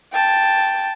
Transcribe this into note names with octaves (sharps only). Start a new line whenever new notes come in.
G5 A5